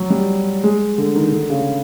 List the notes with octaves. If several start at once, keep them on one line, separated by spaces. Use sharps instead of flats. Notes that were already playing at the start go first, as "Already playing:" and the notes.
Already playing: F#3
G3
G#3
D3
D#3
D3
C#3